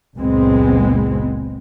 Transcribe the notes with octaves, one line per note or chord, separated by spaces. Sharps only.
F#1 C#2 A#2 G#3 B3 C4